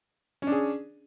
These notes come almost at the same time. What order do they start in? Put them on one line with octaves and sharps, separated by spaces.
C#4 D4 G#4